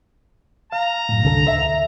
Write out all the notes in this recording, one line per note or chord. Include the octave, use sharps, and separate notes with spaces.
F5 A#5
F#2 A2
C2 D3 A4
D2 E5